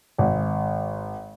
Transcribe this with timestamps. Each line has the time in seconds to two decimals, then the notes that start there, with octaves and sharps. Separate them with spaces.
0.18 G#1